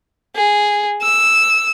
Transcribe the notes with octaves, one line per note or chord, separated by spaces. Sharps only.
G#4
E6